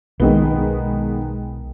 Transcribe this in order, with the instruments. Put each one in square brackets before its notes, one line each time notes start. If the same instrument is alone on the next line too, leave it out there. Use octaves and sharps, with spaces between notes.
[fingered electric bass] B1 [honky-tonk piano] D#3 G#3 B3